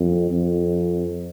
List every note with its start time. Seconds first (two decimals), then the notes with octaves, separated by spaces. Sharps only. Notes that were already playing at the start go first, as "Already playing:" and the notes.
Already playing: F2
0.30 F2